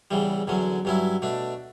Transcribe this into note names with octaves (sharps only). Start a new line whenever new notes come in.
E2 C#3 E3 G3
E2 D3 F#3 C#4
G2 F#3 C#4 E4
B2 A3 D4